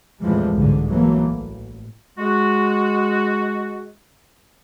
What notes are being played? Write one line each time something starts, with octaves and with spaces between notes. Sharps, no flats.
E2 A2 C3 E3 F3 G#3
C2 G#2 D3
E3 F#3 A3 A#3
A1
G#3 F#4